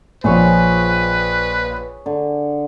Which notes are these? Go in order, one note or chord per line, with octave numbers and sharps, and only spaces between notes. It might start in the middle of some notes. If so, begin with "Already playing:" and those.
A#1 F3 G#4 B4 C#5
D3